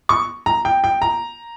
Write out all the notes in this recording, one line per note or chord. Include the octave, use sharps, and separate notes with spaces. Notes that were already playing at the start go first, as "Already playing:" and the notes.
C#6
A#5
G5
G5
A#5